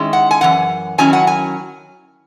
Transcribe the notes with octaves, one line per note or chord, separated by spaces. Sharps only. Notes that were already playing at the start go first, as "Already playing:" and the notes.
Already playing: D#3 G#3 C#4 E4
F#5
G#5
F#2 E3 F#5
D#3 F#3 C#4 E4 G#5
F#5
G#5